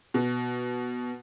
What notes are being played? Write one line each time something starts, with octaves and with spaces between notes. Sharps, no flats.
B2